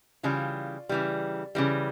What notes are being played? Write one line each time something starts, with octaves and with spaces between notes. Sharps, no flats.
C#3 E3 G3 F4
C#3 E3 G3
C#3 E3 G3